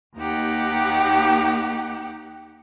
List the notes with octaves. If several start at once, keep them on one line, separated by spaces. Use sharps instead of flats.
D#2 A#3 D#4 G4 F#5